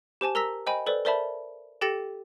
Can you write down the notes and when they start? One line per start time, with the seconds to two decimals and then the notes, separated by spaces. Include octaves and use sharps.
0.21 G4 C5 G#5 A5
0.35 A#4 A#5 E6 A#6 B6
0.66 C5 D#5 G5 G#5 B5
0.86 A4 B4 C5 D5
1.05 A#4 C5 D5 E5 A5 B5
1.81 G4 A4 G5 A6 A#6 C#7